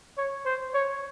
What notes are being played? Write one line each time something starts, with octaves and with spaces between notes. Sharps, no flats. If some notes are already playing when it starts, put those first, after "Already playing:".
C#5
C5
C#5